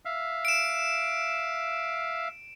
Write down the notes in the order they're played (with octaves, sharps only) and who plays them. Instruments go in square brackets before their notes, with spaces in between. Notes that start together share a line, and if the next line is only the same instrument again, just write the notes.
[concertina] E5 F5
[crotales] D7 E7